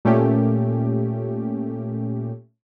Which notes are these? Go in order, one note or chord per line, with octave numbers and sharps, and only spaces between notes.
A#2 A3 C#4 G4